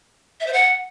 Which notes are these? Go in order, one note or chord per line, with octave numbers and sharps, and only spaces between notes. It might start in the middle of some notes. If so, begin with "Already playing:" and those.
E5
C5
F#5